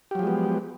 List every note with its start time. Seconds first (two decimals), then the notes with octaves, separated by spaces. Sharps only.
0.11 G4
0.15 F#3
0.19 F3
0.23 G#3
0.27 B3